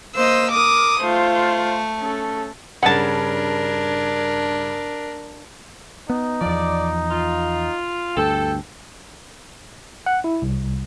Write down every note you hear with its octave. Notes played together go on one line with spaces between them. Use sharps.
A#3 C5 D#5 E6
A#4 D6 D#6
A3 F4 C5
C#4 A4
G2 C#3 D4 A#4 F#5 A5
B3 D#4
E2 F3 D5
F4
D2 G2 A4 G5
F#5
E4
C2